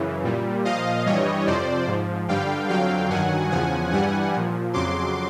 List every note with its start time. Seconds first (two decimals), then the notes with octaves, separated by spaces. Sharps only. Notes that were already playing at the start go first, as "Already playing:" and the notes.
Already playing: F#2 C#3 E3
0.24 A#2 G3
0.65 A#2 F3 D#5 F5
1.06 G2 E3 G3 C#5 D#5
1.47 F2 C3 F3 C5 D5
1.87 G#2 F3
2.28 G2 D3 G3 F5 G5
2.69 F2 D3 F#3 F5 G5
3.10 G2 D#3 F#3 F#5 G#5
3.51 E2 C#3 F3 F#5 G#5
3.92 G2 E3 G3 F#5 G#5
4.33 A#2 F3
4.73 F2 C#3 F#3 C6 D6